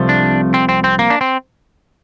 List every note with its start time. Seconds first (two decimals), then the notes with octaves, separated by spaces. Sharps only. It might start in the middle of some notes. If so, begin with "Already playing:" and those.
Already playing: C2 C3 F3 A3
0.09 D4
0.54 C4
0.69 C4
0.84 C4
0.99 A#3
1.10 D4
1.21 C4